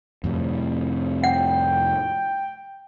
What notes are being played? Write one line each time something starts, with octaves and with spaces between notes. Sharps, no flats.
F2 A2 C3
F#5 G5